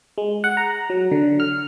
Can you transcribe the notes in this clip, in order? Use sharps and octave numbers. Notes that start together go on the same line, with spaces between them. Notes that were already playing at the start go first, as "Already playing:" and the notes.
G#3
F#5
A#5
F#3
D3
F6